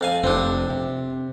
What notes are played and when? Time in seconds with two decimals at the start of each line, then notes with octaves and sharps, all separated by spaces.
0.01 F2 F5 G#5
0.24 F1 C4 D4
0.70 C3